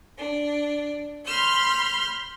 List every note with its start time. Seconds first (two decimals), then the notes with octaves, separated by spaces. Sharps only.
0.18 D4
1.25 B5 C6 F6 G6